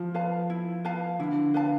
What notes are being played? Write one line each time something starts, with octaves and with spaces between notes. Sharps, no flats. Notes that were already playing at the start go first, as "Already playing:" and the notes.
Already playing: F3
B4 F5 A5
E4
B4 F5 A5
D3 E4
B4 F5 A5